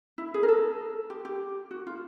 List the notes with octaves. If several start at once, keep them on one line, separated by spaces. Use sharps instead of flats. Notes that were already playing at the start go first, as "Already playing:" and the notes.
E4
G#4
A#4
A4
G4
G4
F#4
F4